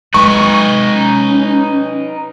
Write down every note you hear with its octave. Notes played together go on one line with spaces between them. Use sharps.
G#3 D#4 B4 C#6
C#4